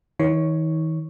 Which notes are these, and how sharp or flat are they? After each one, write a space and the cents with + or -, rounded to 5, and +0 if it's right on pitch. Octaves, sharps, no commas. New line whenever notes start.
D#3 +40 C#5 +0